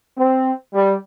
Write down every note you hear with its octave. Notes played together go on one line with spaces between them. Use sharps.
C4
G3